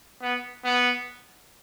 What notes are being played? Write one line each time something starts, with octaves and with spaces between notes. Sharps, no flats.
B3
B3